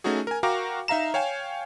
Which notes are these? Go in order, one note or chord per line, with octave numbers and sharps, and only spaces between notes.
A3 C#4 D#4 F#4 G#4
A#4 G#5
F#4 A#4 F5 G5 A#5 D6
D#4 E5 F5 A#5 E7
C#5 F5 G5 G#5